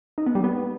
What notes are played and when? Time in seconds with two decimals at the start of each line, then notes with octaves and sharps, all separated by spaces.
0.18 D#4
0.26 B3
0.35 G3
0.44 B3